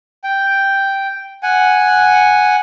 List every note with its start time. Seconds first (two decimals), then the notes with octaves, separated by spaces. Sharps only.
0.24 G5
1.43 F#5 G#5